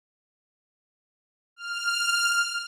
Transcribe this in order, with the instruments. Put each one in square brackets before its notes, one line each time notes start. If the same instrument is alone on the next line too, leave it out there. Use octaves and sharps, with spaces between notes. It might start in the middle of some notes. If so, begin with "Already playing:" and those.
[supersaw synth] F6